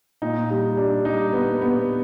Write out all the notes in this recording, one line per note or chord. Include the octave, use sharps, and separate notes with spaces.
A#2 D#4
G3 D#4
G3 D4
G3 D#4
B3
B3